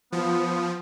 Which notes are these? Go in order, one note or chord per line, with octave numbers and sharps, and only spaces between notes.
F3 B3